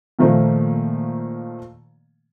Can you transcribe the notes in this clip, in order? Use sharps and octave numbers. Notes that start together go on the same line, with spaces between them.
A#2 D#3 F3 A3 A#3